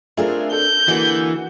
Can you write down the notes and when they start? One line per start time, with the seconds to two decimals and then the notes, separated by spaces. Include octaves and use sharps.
0.17 A3 C4 D4 F4 G#4 A#4
0.52 A4 G6
0.88 D3 E3 A#3 F#4 G#4